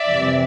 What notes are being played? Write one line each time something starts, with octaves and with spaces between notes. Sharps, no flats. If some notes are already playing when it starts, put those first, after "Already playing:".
Already playing: D5 E5
F2 C3 E3 G3